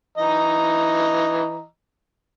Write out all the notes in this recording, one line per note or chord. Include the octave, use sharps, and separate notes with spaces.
E3 D#5 A#5